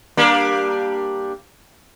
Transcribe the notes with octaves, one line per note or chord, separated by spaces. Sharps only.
G3 A#3 D4